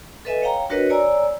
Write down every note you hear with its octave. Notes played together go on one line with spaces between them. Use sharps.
A4 B4 D#5 E5 G#5
C#5 F5 G5 A#5
D4 F#4 A#4 B4 C#5 D#5
C#5 D5 G#5 A#5 E6